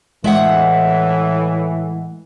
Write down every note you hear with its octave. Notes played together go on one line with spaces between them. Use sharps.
A2 E3 G#3 E5 F#5